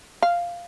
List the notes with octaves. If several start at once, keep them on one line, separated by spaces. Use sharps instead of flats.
F5